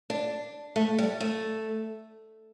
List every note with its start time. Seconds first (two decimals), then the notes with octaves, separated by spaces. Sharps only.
0.10 D4
0.76 A3
0.98 G3
1.20 A3